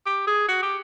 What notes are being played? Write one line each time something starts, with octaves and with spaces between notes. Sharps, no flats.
G4
G#4
F#4
G4